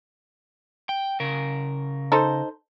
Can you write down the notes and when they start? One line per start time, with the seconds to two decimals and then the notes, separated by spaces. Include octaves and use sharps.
0.89 G5
1.20 C#3 A#4
2.12 D#4 A4 C5